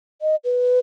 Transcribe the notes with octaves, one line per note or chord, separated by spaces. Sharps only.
D#5
B4